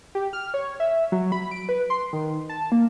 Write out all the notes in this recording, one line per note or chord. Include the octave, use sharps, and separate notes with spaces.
G4
F6
C#5
E5
F#3
B5
D7
B4
C6
D#3
A5
A#3